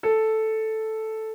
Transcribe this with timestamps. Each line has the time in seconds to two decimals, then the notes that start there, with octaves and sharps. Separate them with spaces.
0.03 A4